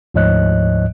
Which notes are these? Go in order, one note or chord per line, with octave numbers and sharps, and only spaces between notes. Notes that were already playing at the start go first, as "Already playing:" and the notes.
D2 G#2 F3 C#5 D#5 F#6